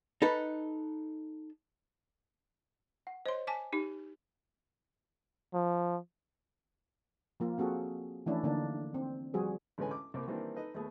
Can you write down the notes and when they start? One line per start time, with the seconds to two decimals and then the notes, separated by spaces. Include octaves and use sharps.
0.22 D#4 A4 B4
3.07 F#5
3.26 C5 C#5 D#5 C6
3.47 G#5 A5 D6 B6
3.73 D#4 G4
5.54 F3
7.40 F3 A#3 F4
7.58 A#3 C4 F#4 G#4 A4
8.26 E3 F3 A3 C#4 D4 E4
8.43 D3 A#3 D4 D#4
8.94 C4
9.34 F3 G3 F#4 G#4 C5
9.78 A1 D2 G#3 C#4 B4 G#5
9.91 D6
10.14 C2 A#3 C4 D6
10.27 D#3 E3 G3 A#3 C4 D4
10.56 D#4 A4 B4 D#5
10.74 D#2 A3 B3 G#4